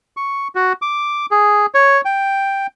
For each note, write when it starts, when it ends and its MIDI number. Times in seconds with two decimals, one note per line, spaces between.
0.17 0.48 85
0.55 0.73 66
0.82 1.26 86
1.31 1.66 68
1.75 2.01 73
2.05 2.67 79